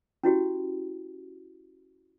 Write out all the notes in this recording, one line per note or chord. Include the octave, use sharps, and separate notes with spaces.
C#4 E4 F#4 G4